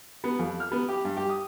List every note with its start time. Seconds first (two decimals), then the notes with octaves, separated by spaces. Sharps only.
0.24 B3
0.39 F2
0.60 F6
0.72 B3
0.89 G4
1.05 G2
1.17 G4
1.29 D#6